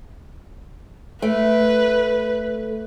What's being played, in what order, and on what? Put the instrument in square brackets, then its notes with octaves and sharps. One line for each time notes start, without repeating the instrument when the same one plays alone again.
[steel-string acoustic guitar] A3 [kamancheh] B4